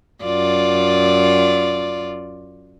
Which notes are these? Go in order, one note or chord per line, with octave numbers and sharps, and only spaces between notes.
F#2 F4 D5